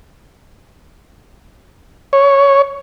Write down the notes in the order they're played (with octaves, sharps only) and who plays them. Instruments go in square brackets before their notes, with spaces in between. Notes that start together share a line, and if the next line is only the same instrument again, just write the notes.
[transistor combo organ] C#5